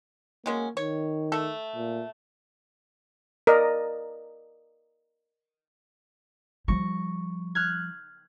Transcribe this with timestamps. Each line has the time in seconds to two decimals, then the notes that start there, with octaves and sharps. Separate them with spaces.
0.46 F#3 G#3 A#3 C#4
0.77 D#3 C#5
1.32 A3 A4
1.76 A#2
3.47 A#4 D5 D#5
6.68 F3 G3 C#6 A#6
7.55 F6 F#6 G#6